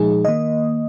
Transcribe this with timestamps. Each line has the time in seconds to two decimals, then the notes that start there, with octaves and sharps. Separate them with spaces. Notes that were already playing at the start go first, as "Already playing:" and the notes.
Already playing: A#2 F3 G#3 D#4 G#4
0.25 D#3 A#3 D#5